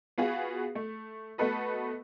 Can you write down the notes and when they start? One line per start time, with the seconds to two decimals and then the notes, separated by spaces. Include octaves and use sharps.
0.18 B3 F4 F#4 G#4
0.75 A3
1.38 A3 B3 F#4 A4 B4 D#5